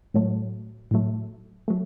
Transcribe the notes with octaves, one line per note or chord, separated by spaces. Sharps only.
A2 F#3 A3
A2 F#3 A3
F#3 A3